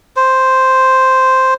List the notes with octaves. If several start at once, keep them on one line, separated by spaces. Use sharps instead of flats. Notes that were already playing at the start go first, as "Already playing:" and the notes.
C5